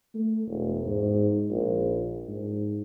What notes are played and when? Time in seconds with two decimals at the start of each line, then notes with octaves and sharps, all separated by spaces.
0.15 A3
0.47 E1
0.86 G#2
1.50 A#1
2.27 G#2